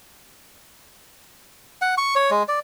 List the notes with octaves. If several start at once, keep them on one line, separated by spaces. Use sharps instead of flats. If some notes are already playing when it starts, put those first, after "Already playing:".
F#5
C#6
C#5
G#3
D5